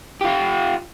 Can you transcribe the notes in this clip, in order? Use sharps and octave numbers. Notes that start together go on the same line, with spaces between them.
F4 G4